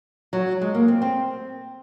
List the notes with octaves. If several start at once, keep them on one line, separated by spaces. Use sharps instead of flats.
F#3
G#3
A#3
C4
C4